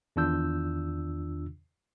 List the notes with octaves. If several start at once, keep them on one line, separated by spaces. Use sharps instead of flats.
E2 D#3 D4 F4 E6 G6